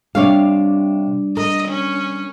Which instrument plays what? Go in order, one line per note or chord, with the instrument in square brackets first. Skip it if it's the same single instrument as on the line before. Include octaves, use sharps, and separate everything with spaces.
[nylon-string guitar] C3 C#5 F5 [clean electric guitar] G3 D4
[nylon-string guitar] A#4 [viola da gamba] D#5
[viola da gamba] C#4